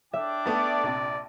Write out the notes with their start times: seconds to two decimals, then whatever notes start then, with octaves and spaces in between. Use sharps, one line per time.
0.13 D4 E5 G5 D6
0.46 A3 B3 D5 E5 A5
0.83 A#1 C3